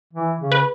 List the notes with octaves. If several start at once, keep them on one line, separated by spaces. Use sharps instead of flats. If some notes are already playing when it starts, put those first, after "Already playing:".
E3
C#3
B4